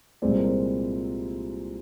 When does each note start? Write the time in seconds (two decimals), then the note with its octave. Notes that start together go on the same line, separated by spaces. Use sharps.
0.22 C2 A#2 G#3 C4 D5
0.30 C5
0.38 A#4
0.45 C5